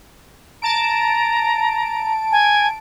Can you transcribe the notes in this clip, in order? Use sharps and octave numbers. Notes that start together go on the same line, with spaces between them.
A5 A#5 D7
G#5